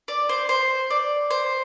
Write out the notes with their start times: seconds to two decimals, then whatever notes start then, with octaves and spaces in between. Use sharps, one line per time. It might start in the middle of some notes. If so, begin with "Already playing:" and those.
0.08 D5
0.29 C5
0.49 C5
0.90 D5
1.31 C5